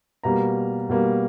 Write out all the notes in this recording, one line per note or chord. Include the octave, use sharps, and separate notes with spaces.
B2 G3 A#3 A#5
B2 G3 A#3